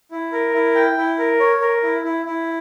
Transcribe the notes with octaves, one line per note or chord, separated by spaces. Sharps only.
E4
A#4
E4
G5
E4
A#4
C#5
A#4
E4
E4
E4